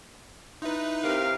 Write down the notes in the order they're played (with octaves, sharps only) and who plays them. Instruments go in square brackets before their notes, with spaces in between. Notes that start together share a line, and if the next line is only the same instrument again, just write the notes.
[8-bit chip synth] D#4 B4 [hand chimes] E4 E5 C6
[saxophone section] C3 G4 A#4 [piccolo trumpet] F5